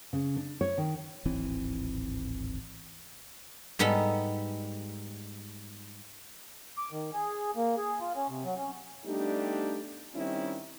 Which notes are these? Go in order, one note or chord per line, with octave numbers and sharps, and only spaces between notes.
C#3
D4
C#5
D#3
D1 G#1 E3 C4
G#2 G3 B3 D#4 A4
D6
D#3
G#4
A#3
G#4
F4
C#4
C3
F#3
C#4
G3 A3 B3 D4 D#4 G4
D#3 G3 C4 C#4 D#4 E4